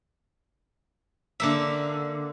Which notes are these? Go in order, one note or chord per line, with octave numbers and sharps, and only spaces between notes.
D3 A#3 E5